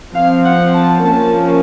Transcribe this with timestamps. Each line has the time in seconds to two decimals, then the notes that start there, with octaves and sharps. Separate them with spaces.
0.14 F3 C4 F5
0.44 F#5
0.74 A5
1.03 F3 A#3 C#4 A5